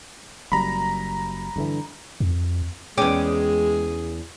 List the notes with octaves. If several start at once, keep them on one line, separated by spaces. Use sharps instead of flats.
F#1 F#2 G3 A#5 B5
G2 D3 E3
F2
E2 G#3 C#4 G#4 G5 D6 D#6